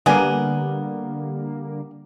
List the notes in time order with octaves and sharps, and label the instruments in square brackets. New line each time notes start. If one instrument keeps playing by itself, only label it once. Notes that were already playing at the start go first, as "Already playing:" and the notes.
[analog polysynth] D3 G3 A#3 [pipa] B3 G#5